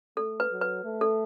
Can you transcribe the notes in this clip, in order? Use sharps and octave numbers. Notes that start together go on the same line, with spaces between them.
A3 A4
B4
F#3
B4
A3
A4